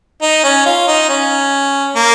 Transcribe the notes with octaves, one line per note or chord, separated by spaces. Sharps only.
D#4
C#4
F4
D#4
C#4
A#3